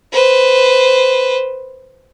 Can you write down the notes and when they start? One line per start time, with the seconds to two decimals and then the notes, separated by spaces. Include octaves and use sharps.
0.13 B4 C5